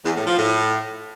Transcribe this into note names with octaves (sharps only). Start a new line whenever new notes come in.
E2
A2
F3
A2